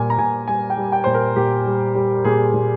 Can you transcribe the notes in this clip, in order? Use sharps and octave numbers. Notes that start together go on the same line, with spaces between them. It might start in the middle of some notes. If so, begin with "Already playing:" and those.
Already playing: A#2 G3 G#5
A#5
A#2 G#5
G3 G#5
G5
G3
G5
A#2 C5
A#4
A#2 G4
G3
G3
A#2 G#4
A#2